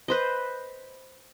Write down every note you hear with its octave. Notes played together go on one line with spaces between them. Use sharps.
B4 C5 D#5